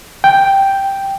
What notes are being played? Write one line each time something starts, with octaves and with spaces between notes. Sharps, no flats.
G5